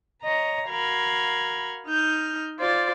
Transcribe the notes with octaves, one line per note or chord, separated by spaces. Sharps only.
C#5 D#5 A#5
F#4 A#4 F5 B5 G#6
D#4 F6 G6
F4 C5 D5